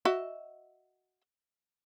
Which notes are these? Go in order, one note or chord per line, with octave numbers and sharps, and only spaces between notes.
F#4 D#5 E5